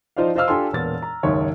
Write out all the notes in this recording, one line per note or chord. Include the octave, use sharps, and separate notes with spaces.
F3 D#4 F4 C5 D5 F5
F4 C5 D#5 F5 E6 F6
D4 F4 G4 A4 G#5 C6
E1 A#2 B3 A6
A#5
F#1 D#2 G#2 C#5 E5